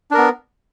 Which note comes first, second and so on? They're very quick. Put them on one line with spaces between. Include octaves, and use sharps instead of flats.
D4 A#4 B3